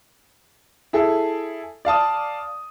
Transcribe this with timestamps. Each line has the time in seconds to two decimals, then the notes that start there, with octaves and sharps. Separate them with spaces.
0.93 E4 G#4 A4
1.85 D5 F5 A5 D#6